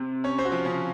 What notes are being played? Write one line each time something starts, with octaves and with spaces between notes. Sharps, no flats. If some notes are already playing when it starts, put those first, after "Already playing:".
Already playing: C3 C4
C#4 C#5
C4 C5
F#4
F3 F4
C#3 C#4